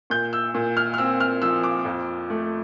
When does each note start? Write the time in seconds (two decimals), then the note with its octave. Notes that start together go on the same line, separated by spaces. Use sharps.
0.10 A#2 G6
0.33 E6
0.54 A#2
0.77 F6
0.94 F6
0.98 C4 E6
1.20 F6
1.42 F3 E6
1.63 D6
1.85 F2
2.30 A3